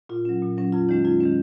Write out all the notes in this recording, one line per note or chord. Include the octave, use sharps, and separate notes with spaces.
A#2 F4
F#3 C#4
A#2
F#3 C#4
F2 F4
D#3 G#3 C#4 D#4
F2 F4
D#3 G#3 C#4